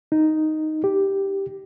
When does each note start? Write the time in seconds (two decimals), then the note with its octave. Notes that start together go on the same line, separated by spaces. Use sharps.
0.12 D#4
0.84 G4